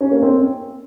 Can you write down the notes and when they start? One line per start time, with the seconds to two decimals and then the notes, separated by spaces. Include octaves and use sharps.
0.01 C#4
0.11 A#3
0.22 C4